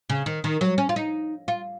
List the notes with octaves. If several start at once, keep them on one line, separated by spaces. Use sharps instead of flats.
C#3
D#3
D#3
F#3
C#4
F4
D#4
F4